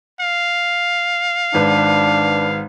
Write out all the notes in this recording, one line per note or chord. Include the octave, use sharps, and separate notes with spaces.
F5
G#1 D4 B4